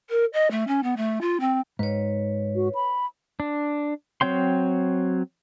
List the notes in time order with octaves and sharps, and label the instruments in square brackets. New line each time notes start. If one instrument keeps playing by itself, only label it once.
[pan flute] A#4
D#5
A3
C#4
B3
A3
F4
C4
[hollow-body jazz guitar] G#2 [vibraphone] B4 C#5
[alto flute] F#4
B5
[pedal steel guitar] D4
F#3 C4 C#5 G5 C6